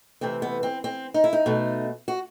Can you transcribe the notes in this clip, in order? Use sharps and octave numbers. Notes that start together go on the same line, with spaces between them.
C3 E3 A3 C4
B3
C4
C4
D#4
E4
D#4
B2 A3
F#4